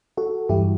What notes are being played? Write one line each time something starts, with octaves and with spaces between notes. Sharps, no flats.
F#4 A4
G2 E3 G3 E4 G4